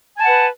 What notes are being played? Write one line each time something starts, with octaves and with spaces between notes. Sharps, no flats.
B4 F#5 G#5 A5